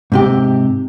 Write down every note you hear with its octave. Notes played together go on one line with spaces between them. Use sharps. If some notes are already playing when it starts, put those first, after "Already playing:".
G#2 C3 G4